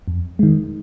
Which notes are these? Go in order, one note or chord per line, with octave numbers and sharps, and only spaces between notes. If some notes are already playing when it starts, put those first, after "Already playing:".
F2
D#3 G#3